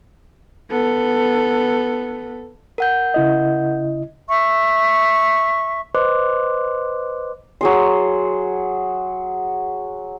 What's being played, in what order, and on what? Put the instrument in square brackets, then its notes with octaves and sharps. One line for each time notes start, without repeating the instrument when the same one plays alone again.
[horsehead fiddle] B3 A4
[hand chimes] A#4 F#5 G6
[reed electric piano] C#3 E4 D#5
[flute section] E5 C#6
[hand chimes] B4 C5 D#5 C6 D6 F#6
[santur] F#3 G#4 C6